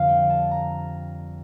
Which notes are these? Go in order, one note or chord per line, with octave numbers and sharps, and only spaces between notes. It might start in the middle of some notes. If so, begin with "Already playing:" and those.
Already playing: F2 D3 G3 F5
G5
A5
A#5